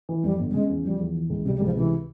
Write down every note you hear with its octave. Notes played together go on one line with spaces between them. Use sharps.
E3
F2 G3
G1
G3
C#3 G#3
E2
F3 G3
E2
E3
C#2
C3 G3
G3
C#2 F3
C3 E3